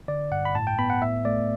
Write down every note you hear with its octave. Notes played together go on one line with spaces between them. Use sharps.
D3 D5
G2 F#5
B5
A2 A5
G5
B3 B5
F#5
A2 E5
A3 D5